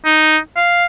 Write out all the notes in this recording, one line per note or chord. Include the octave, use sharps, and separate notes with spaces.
D#4
F5